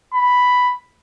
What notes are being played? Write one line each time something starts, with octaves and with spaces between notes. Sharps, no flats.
B5